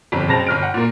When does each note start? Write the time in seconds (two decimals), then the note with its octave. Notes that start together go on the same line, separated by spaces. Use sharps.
0.12 G1 F2
0.28 F#1 C#3 C4 A5 A#6 F7
0.47 G1 F6 D7
0.62 F#5
0.74 A#2 A#3